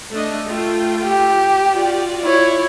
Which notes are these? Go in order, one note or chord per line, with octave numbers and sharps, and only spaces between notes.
A3 D4 D#5
A3 F4 G5
G4
F4 F#4 D5
E4 C#5